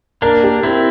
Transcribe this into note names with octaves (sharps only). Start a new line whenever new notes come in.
A#3 D4 A#4
G4
C4 E4 A#4